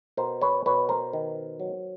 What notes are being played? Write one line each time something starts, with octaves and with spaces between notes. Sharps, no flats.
B2 A#4 C5
B4 C#5
B2 B4 C#5
A#4 C5
D#3
F#3